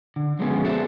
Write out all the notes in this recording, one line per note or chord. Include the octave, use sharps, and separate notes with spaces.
D3
F3 F#3 G#3 A3 B3 C#4
F#4 G#4 A4 B4 C5 E5